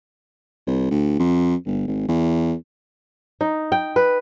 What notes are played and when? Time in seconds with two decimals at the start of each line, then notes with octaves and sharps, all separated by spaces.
0.67 C2
0.91 D2
1.19 F2
1.66 G1
1.88 G#1
2.09 E2
3.41 D#4
3.72 G5
3.96 B4